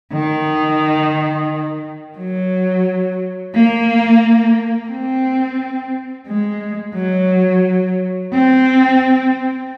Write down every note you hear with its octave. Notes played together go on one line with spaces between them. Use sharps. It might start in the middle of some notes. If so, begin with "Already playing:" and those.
D#3
F#3
A#3
C4
G#3
F#3
C4